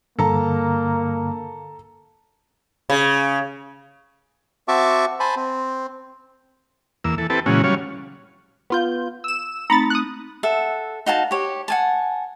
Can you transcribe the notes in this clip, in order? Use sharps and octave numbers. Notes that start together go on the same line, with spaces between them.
G2 D3 A#3 A4 A5 A#5
C#3
C4 F#4 E5 A5 C#6 D6
C5 G#5 A5 B5
C4
E2 A#3 E6
E3 A4
C4 E4 G4 A4 B4 A5
A#2 C#3 E3 G#3 C#4 F#4
F#3 G3 C#4 C#5 F5
B3 F4 G6
E6 E7
A3 C4 D#4 A#5 B5 A6
D#6 F#6
A4 E5 F#5
D#4 F#4 F5 A5
G4 C#5
F#5 G#5 A5